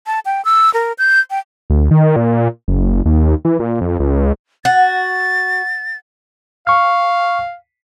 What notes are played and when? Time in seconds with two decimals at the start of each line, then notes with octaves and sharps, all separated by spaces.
0.07 A5
0.25 G5
0.45 E6
0.74 A#4
0.98 G6
1.30 G5
1.70 D2
1.91 D#3
2.16 A#2
2.68 F#1
3.05 D#2
3.45 E3
3.59 A#2
3.81 F2
3.99 C#2
4.65 F#4 A6
6.67 F5 C#6 F6